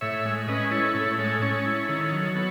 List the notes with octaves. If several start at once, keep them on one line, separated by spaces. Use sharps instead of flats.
A2 C#5 E5
G#3
C#4 B4 D#5
E4 A4 C#5
A2 A4 C#5
G#3 A4 C#5
C#4 A4 C#5
E4
D#3
F#3
B3